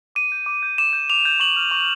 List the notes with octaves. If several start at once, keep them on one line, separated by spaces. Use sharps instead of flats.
D6 D#7
G6
D6
G6
D6 E7
G6
D6 F7
G6
C#6 F#7
F6
C#6